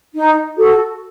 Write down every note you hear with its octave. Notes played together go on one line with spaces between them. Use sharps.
D#4
F#4 A4